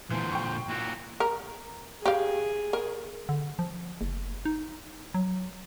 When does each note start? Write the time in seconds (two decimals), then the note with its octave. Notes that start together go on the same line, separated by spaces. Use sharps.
0.10 A#2 D3 E3 C5
0.31 G5 C#6
0.69 A#2 E4 F#4
1.20 A#4
2.06 G4 G#4 F5
2.73 A#4
3.29 D3
3.59 F3
4.01 F#1
4.45 D#4
5.14 F#3